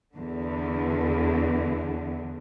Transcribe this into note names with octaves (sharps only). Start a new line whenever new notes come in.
E2 D3